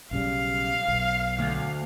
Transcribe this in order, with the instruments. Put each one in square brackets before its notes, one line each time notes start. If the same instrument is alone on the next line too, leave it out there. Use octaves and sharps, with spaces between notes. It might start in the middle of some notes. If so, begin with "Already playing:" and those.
[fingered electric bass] B1 C#3 G3 [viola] F5
[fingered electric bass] B1
[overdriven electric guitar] D2